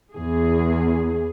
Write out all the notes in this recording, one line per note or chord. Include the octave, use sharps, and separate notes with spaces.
E2 G#4